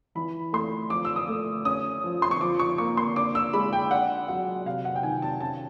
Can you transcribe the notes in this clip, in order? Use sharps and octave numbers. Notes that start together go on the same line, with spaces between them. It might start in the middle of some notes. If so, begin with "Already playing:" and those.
E3 B5
A3 C6
F3 D6
E6
D#6
A3
C#4 D#6
F3
C6
C#6
F3 D6
C#6
A#3 C#6
C6
D4 D6
E6
G#3 B5
G5
D4 F#5
F#3 F#5
C3 F5
F#5
G5
D#3 G#5
A5
C#4 A5